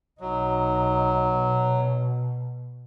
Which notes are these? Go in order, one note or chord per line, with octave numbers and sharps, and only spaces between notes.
B1 F#3 D#4
B2